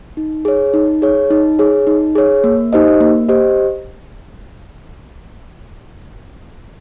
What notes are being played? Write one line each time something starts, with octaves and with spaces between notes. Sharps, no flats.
D#4
G#4 C#5
D#4
G#4 C#5
D#4
G#4 C#5
D#4
G#4 C#5
A#3
D#4 G4 C5 D#5
A#3
G4 C5 D#5